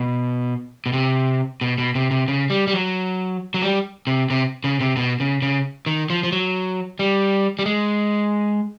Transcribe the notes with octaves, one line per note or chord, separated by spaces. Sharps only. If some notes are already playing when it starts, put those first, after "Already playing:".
Already playing: B2
B2
C3
B2
B2
C3
C3
C#3
G3
G3
F#3
F#3
G3
C3
C3
C#3
C3
B2
C#3
C#3
D#3
F3
F3
F#3
G3
G3
G#3